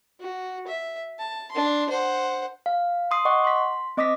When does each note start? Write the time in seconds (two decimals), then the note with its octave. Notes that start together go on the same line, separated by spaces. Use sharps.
0.20 F#4
0.67 E5
1.19 A5
1.51 D4 C6
1.89 C5 F#5
2.66 F5
3.11 C6 D#6 C7
3.25 D#5 F#5 C#6 D6
3.44 C6 B6
3.97 C4 D#5 D6 D#6 A#6 B6